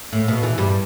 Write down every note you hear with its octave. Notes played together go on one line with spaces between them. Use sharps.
A2
B2
E2 E3
G2 G3